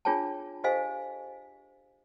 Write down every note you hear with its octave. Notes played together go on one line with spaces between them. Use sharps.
D4 F4 G#4 C#5 G5 A5
G4 A4 C5 D#5 F5 G#5